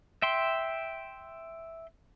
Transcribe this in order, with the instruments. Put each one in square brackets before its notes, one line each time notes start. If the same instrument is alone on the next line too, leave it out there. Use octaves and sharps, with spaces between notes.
[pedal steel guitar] E5 G5 C6